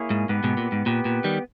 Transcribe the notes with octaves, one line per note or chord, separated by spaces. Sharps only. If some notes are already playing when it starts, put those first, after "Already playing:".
Already playing: A#3 E4 G#4 C#5
G#2
G#2 B3 G4 B4
G#2 B2
A#2
G#2
A#2 B3 G4 B4
A#2
D#3 G3